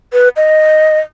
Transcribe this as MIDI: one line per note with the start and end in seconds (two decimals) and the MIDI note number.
0.13 0.29 71
0.37 0.99 75